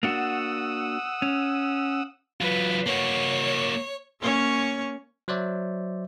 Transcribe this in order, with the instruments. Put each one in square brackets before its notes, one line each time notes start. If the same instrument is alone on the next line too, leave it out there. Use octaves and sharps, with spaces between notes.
[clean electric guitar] A#3 D4 F#4 [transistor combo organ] F#5 D#6 E6
[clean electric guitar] C#4
[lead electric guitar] F#3 F4 [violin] B4
[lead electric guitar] A#3 F#4 [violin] C#5
[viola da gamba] A#3 C#4 C#5
[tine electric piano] F#3 C5 D5 E5